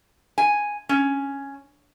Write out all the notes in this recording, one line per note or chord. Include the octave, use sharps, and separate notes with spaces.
G#5
C#4